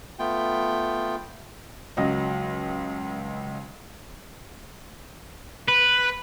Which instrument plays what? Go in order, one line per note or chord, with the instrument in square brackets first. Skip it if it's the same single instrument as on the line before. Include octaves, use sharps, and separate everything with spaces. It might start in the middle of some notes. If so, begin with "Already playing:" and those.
[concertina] A3 B3 F4 G5
[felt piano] C#2 F#3 D#5
[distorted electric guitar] B4